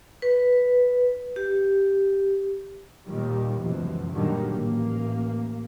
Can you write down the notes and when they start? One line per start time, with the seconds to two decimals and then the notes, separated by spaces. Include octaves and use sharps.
0.22 B4
1.36 G4
3.07 D#2 A#2 D#3 G3
3.58 F1 C#2 F#2 B2 E3 F3
4.11 A#2 D3 D#3 F#3 G3
4.47 A1 A#3